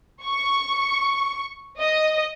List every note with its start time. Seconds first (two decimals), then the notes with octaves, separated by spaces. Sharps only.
0.23 C#6
1.79 D#5